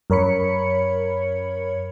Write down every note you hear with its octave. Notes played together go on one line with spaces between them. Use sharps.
F#2 A#4 C#5 B5 C#7